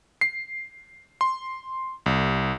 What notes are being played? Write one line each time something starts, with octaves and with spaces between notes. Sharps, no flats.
C7
C6
C2